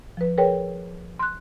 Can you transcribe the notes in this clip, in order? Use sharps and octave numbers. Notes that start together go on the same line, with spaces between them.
F3 B4
G#4 A#4 B4 C#5 G5
C6 F#6